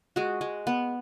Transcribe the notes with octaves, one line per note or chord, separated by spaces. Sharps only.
G#3 F#4
G#3
B3